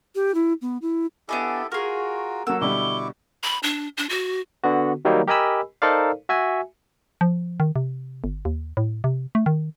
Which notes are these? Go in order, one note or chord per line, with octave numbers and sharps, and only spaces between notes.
G4
E4
B3
E4
B3 D4 E4 G4 A4 D#5 G#5
F4 F#4 G#4 A#4 C#6
F#3 A#3 A4 F#5 E6
B2 D3 G3 E4 C#6 D6 G7
B5
D4
D4
F#4
D3 B3 F#4
D#3 F#3 G3 A#3 D#4
G4 A#4 D#5 G#5 B5 E6
D#4 A4 A#4 C5 D5 F5
F#4 E5 G#5
F3
D#3
C3
G1
D#2
A2
C3
A3
D#3